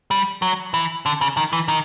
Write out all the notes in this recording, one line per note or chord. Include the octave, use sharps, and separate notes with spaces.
G3
F#3
E3
D3
C#3
D#3
E3
D#3